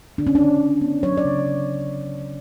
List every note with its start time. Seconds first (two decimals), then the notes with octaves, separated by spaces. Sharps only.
0.18 D3 D4
0.27 C#4
0.35 D3 D4
0.60 D3
0.81 B3
1.03 F#3 C#5
1.17 D5
1.25 C#3